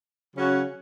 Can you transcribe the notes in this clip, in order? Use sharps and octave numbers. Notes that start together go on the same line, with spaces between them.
C#3 F#3 C#4 F#4